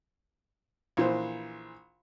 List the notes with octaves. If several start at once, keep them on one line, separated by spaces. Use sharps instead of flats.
A#1 E3 C5